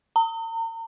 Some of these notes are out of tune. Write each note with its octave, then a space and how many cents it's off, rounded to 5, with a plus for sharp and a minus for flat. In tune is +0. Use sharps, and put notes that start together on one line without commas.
A#5 -40